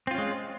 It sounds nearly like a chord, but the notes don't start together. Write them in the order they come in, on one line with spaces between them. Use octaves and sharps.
C4 F4 C#4 G#3